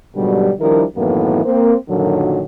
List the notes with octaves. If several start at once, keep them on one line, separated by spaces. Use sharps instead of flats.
G#2 B2 D3 F#3 G3
D#3 F3 G3 D4 E4 A#4
F#2 A2 D#3 E3 A#3 B3
A#3 C4
F#2 A#2 D3 D#3 F3 F#3